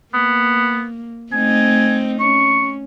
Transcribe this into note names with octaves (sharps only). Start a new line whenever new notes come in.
A#3 B3
A3 C4 D#4 G#5
C#4 C#6